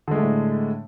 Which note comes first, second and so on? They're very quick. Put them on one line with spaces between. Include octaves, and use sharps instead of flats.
D3 G#3 A3 D4 A2